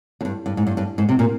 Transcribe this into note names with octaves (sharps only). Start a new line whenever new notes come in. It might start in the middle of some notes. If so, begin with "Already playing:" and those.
F2
G2
G2
G#2
G2
G2
G#2
C3
A#2